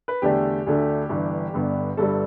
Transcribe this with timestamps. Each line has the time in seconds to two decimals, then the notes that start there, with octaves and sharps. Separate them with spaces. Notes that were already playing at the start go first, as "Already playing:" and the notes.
0.08 B4
0.22 E2 D3 A3 D4 G4
0.67 D2 D3 A3 D4
1.09 G1 G2 E3
1.54 G1 G2 D3 B3
1.97 G1 G2 G3 A4